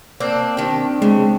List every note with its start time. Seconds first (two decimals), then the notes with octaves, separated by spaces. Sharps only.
0.20 A#3 C4 D4
0.57 D#3 C4 D4 G4
1.02 C#3 G#3